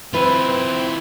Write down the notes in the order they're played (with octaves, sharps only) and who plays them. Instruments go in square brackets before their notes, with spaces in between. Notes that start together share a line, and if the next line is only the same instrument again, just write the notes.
[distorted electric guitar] E3 F4 [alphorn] C4 [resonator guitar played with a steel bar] E4 B4